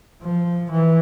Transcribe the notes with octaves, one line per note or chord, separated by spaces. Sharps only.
F3
E3